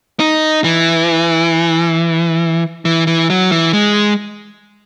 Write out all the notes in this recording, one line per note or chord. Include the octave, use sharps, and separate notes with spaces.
D#4
E3
E3
E3
F#3
E3
G#3